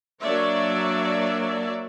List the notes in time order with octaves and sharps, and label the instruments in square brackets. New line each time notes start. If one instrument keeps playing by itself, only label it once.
[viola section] F#3 A#3 D4 C#5 D5 E5